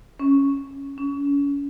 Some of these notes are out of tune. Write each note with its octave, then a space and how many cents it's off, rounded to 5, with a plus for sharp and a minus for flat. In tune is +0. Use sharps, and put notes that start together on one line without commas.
C#4 +0
C#4 +35